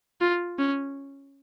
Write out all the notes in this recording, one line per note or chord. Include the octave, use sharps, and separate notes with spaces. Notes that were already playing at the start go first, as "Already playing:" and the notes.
F4
C#4